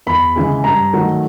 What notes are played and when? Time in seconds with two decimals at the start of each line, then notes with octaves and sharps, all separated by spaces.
0.07 E2 B5
0.36 C#3 E3 G#3
0.64 G2 A#5
0.93 D#3 F#3 A3